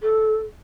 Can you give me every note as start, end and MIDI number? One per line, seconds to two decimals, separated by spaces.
0.01 0.40 69